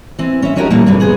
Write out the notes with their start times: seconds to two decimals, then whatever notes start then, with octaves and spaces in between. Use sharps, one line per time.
0.19 E3 C4
0.42 C#4 E5
0.56 F3 C#4 D#4 F#4 G4 A#4
0.70 A#2 E3 G3 A3 A#3
0.86 G2 C3 E3 F#3
1.00 B3 G#4 C5